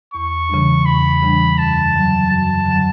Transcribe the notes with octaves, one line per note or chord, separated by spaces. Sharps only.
E2 C#6
C#3 E3 G3 D4
E2 B5
C#3 E3 G3 D4
F#2 A5
D3 F#3
F#2 A5
D3 F#3